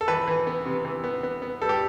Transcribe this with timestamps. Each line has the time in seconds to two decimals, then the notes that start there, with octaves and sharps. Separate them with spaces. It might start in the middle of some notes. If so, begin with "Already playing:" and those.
0.01 A4
0.08 E3 B4
0.28 E3
0.47 B3
0.66 C3
0.85 E3
1.04 B3
1.23 B3
1.42 B3
1.62 G3 A4
1.69 G4